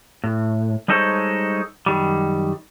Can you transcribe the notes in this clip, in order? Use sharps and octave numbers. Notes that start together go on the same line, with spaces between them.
A2
G3 G#3 D#4 A4 C5 C#5
F#2 D#3 G3